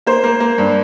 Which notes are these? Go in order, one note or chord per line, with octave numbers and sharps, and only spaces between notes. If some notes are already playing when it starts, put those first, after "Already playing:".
A#3 C5
A#3
A#3
G2